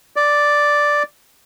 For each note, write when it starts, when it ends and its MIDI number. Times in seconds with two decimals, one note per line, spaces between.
0.16 1.03 74